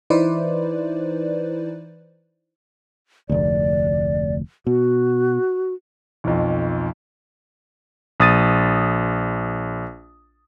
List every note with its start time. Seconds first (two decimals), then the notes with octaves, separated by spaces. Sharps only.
0.10 E3 D#4 E4 B4 C5 D5
3.29 F1 D2 D5
4.67 B2 F#4
6.24 B1 F2
8.20 A#1 D#6 A6 D#7